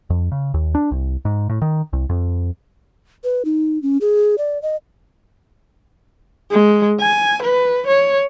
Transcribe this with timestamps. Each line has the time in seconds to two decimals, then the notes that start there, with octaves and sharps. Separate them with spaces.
0.10 F2
0.32 C#3
0.54 D#2
0.75 D4
0.91 C2
1.25 G#2
1.49 A2
1.62 D#3
1.93 C2
2.09 F2
3.24 B4
3.45 D#4
3.82 C#4
4.01 G#4
4.38 D5
4.62 D#5
6.51 G#3
7.00 G#5
7.43 B4
7.87 C#5